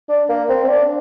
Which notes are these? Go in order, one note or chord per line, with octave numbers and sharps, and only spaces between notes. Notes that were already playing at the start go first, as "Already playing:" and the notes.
D4
A#3
C4
C4
D4